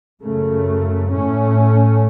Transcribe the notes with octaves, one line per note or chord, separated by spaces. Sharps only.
F#2 C#3 A3
A2 A3 C#4